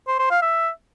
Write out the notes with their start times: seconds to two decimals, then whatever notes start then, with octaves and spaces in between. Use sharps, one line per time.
0.07 C5
0.19 C5
0.30 F5
0.42 E5